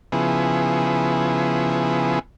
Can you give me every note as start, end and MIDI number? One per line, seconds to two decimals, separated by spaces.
0.12 2.19 49
0.12 2.19 53
0.12 2.19 59
0.12 2.19 64
0.12 2.19 68